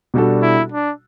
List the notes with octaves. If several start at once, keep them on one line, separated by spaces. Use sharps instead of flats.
B2 G3 D4 F#4 A4
E4
D4